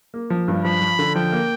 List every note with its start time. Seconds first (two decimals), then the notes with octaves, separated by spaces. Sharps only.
0.14 A#3
0.30 F3
0.48 G2
0.64 F3 B5
0.82 F3
0.99 D3
1.15 F3 G5
1.32 A#3